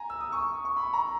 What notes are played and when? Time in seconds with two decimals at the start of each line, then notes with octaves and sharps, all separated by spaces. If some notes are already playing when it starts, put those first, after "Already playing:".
Already playing: G#5 A#5
0.10 E6
0.20 D#6
0.32 C#6
0.65 C#6
0.77 B5
0.93 A#5